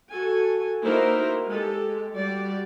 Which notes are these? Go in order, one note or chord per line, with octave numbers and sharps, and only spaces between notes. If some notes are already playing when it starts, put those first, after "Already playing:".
F#4 A4 G#5
A#3 D#4 E4 F#4 A#4 C5
G#3 G4 A4
G3 F#4 D5